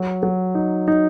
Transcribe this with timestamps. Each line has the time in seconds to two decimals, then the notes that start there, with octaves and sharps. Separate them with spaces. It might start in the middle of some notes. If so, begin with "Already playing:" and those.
Already playing: F#3
0.23 F#3
0.55 D#4
0.88 D#4